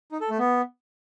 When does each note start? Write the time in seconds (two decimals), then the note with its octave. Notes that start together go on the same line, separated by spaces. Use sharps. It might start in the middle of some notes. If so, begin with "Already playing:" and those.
0.12 D#4
0.21 A4
0.30 A3
0.38 B3